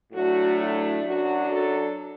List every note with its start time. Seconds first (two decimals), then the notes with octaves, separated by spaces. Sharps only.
0.12 A2 F#3 A3 D4 F#4
0.58 E4
1.04 F#2 F#3 D4 F#4
1.50 A4